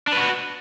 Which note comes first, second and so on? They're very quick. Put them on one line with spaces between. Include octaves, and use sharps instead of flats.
D4 B4 F#4